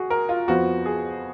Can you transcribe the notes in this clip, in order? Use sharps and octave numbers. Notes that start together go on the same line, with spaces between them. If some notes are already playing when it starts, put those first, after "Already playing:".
Already playing: F#4 G#4
A#4
F4
F2 F3 B3 F#4
G#4